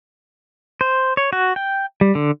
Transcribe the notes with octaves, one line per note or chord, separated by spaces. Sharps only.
C5
C#5
F#4
G5
G3
D3